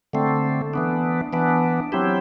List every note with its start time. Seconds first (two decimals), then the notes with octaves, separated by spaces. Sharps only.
0.13 D3 A3 C4
0.74 E3 B3 D4
1.33 E3 B3 D4
1.92 F#3 C4 E4 G4